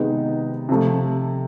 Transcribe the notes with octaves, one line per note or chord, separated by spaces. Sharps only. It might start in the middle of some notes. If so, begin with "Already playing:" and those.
Already playing: C3 D#3 G#3 B3 D#4
C3 F3 A3